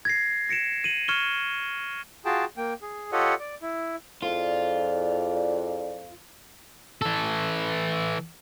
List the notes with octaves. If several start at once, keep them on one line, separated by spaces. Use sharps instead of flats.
G#6 A#6 C7
A#6 C#7 D7 E7
D#7 F#7
C#6 F6 G#6 C#7 E7 G7
F4 F#4 G#4 G5 A5
A#3 G5
G#4
F4 G4 A4 C#5 D#5 F#5
D5
E4
F2 E4 F4 G#4 D5
E3 A4